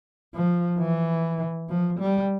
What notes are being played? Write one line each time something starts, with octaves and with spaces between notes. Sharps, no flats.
F3
E3
F3
G3